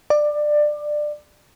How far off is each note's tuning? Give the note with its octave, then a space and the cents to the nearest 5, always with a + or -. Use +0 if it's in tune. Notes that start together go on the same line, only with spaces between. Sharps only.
D5 +20